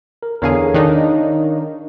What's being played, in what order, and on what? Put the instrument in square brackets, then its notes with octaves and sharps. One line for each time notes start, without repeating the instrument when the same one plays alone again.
[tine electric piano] A#4
[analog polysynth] E2 D3 G#4 [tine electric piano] A#4 C#5 F5
[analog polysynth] D#3 D4 D#4